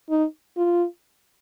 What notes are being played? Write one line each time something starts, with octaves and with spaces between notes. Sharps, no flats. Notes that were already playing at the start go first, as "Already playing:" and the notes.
D#4
F4